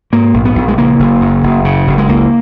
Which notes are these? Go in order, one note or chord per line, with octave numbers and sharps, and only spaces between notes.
G#2 A#3
A#1
B3
A#1
G#3
C#3 A#3
F#1
F#2
F#1
C#3
F#1
G#3
C#2 A#3